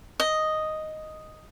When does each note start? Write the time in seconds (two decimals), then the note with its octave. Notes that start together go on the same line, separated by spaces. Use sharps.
0.20 D#5